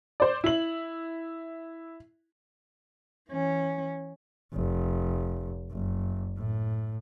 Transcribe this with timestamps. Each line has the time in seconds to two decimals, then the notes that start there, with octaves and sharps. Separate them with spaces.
0.20 C5 D5
0.44 E4 F#7
3.29 E3 C#4
4.54 F1
5.71 F#1
6.36 A2